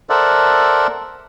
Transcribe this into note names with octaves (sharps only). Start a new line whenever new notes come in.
A4 A#4 C5 D5 E5 F#5